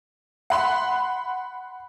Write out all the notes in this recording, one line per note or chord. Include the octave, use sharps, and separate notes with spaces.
F#5 B5 C6